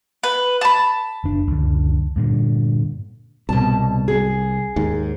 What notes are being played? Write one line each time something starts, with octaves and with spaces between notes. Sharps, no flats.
B4
A5 B5
F#1 D4
C#2 F#2 D3
G2 A#2 D3
C2 B2 A5
G#4
D#2 G#2